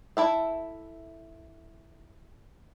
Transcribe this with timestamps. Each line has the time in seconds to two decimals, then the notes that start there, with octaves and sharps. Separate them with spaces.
0.17 E4 A4 E5